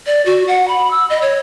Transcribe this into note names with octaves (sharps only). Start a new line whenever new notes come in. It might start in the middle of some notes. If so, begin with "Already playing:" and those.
D5
F#4
F#5
B5
E6
D#5
C#5